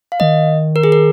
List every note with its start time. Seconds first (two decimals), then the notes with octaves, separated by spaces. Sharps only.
0.12 F5
0.20 D#3 D#5
0.76 A#4
0.84 G#4
0.92 A#4